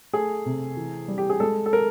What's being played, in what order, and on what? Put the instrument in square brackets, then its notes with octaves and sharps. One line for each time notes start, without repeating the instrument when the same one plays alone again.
[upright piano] A3 G#4
C3
E3
G3
G4
G#4
G#3 A4
A4
A#4